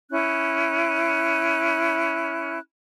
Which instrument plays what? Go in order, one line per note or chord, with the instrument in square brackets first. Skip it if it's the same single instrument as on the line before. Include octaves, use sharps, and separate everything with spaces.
[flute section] C#4 E4 F#6